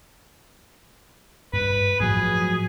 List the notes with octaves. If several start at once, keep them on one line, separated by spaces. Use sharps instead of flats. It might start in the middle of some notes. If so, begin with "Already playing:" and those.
G2 B4
A2 F3 F#3 G#4